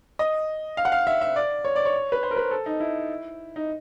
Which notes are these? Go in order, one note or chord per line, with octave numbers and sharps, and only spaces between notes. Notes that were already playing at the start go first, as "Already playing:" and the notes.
D#5
F5
F#5
F5
E5
E5
D5
C#5
D5
C#5
B4
C5
A#4
B4
A4
D#4
E4
D#4